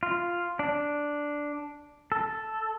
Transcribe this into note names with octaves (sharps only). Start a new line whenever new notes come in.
F4
D4
A4